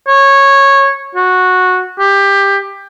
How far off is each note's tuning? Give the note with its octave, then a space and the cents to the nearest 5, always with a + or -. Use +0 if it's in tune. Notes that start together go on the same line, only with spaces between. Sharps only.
C#5 -15
F#4 -10
G4 +15